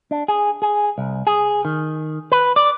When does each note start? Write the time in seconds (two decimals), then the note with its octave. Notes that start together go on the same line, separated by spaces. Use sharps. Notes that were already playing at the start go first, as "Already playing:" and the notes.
0.11 D4
0.28 G#4
0.62 G#4
0.98 C2
1.27 G#4
1.65 D#3
2.32 B4
2.56 D5